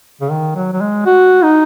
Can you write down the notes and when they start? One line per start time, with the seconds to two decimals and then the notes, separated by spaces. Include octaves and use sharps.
0.21 C#3
0.31 D#3
0.55 F#3
0.73 F#3
0.81 G#3
1.06 F#4
1.43 D#4